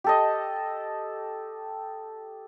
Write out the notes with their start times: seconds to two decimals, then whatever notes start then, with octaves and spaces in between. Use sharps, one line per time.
0.04 G4 A4 D#5